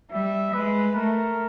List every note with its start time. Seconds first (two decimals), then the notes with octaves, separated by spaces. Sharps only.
0.12 G3 E5
0.54 G#3 B4
0.96 A3 A#4